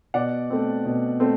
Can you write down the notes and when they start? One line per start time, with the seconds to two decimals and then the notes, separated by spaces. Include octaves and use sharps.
0.14 B2 D5 F#5
0.50 A3 C4
0.85 B2
1.20 A3 C4